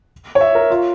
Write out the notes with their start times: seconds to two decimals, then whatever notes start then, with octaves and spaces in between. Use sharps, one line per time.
0.35 C#5
0.41 E5
0.55 A#4
0.70 F4